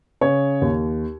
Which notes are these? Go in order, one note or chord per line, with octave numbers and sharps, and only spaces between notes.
C#3 C#5
D#2